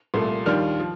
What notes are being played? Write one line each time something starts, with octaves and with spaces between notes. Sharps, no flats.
C2 A#2 A3
D#2 D#3 G3 D4 F4 F6
F3